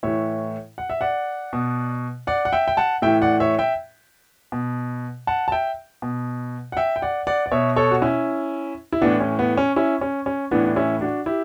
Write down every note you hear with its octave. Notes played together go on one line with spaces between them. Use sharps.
A2 E3 C#5 E5
F#5
E5
D5 F#5
B2
D5 F#5
F#5
E5 G5
G5
F#5 A5
A2 E3 E5 G5
D5 F#5
C#5 E5
E5 G5
B2
F#5 A5
A5
E5 G5
B2
F#5
E5 G5
G5
D5 F#5
D5 F#5
D5
B2 C#5 E5
A4 C#5
F#4
C#4 E4
E4
A2 E3 B3 D4
C#4
B3
C#4
C#4 E4
C#4
C#4
A2 E3 B3 D4
D4
C#4 E4
D4 F#4
E4 G4